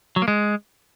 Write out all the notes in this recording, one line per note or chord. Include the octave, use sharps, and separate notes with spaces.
F#3
A#3
G#3